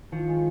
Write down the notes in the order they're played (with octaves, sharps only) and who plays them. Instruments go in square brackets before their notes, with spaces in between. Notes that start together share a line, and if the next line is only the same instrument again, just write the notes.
[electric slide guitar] D#3 [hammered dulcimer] F3
[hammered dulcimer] G#3